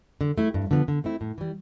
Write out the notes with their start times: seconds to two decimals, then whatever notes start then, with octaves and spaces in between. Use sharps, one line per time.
0.21 D3
0.38 A3 E4
0.54 G2
0.71 D3 F3 B3
0.88 D3
1.04 A3 C4 E4
1.21 A2
1.38 E3 G3